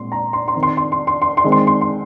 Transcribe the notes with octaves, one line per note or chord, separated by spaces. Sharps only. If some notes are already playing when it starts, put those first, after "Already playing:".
Already playing: A#2 G#3 C4 C6
A#5
C6
C6
D#3 C4
C6
C6
C6
C6
C6
C6
D#3 G#3 C4
C6
C6
C6